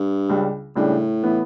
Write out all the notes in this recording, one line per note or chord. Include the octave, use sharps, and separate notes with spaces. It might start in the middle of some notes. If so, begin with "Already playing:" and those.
Already playing: G2
C#2 C#3 G3 D4
C#2 A2 C#3 G3 D4
E3 B3